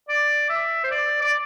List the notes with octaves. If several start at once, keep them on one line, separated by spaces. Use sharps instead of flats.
D5
E5
C5
D5
D5